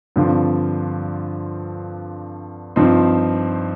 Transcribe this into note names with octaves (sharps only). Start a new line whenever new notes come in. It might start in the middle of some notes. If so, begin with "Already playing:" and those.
G2 D3 F3 C4 F4
G2 F3 C4 D#4